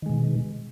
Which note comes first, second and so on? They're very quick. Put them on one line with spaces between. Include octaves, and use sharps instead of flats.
D#3 G#3 B2